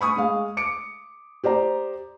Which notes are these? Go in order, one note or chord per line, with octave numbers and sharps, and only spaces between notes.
B5 C#6 D#6
G#3 G#4 F5
D6 C#7 D7
G4 C5 D5 A#5